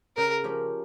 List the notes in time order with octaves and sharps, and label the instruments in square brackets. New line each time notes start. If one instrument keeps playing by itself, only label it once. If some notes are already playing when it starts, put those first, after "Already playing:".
[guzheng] C#3 [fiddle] A#4
[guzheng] F3 C#4 G4 A#4